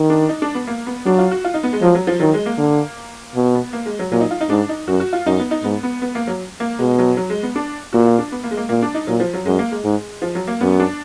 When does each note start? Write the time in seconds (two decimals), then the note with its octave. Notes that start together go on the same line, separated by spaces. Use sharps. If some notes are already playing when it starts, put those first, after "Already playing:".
Already playing: D#3
0.10 D4
0.29 D#4
0.42 D4
0.55 B3
0.67 A#3
0.87 B3
1.06 F#3 D4
1.19 F4
1.31 F#4
1.44 F4
1.54 D#4
1.63 B3
1.73 G#3
1.82 F3 F#3
1.95 F#3
2.07 F3
2.20 D#3 F#3
2.34 G#3
2.46 A#3
2.58 D3
3.36 B2
3.55 B3
3.73 A#3
3.86 G#3
3.99 F#3
4.12 A#2 F#3
4.20 D#4
4.31 F4
4.41 D#4
4.50 G#2 D4
4.69 D#4
4.88 F#2 F#4
5.00 F#4
5.13 F4
5.26 F#2 D#4
5.39 B3
5.51 D#4
5.63 G#2 B3
5.83 B3
6.02 B3
6.15 A#3
6.27 F#3
6.60 A#3
6.79 B2 G#3
6.98 F#3
7.17 F#3
7.30 G#3
7.43 B3
7.56 D4
7.93 A#2 F#4
8.06 F4
8.19 D4
8.32 B3
8.44 A#3
8.51 G#3
8.57 A#3
8.69 A#2 A#3
8.82 D4
8.94 D#4
9.07 A#2 F#3
9.20 F3
9.34 F#3
9.46 F#2 G#3
9.59 A#3
9.72 G#3
9.84 G#2
10.22 F3
10.35 F#3
10.47 A#3
10.61 F#2 B3
10.80 D4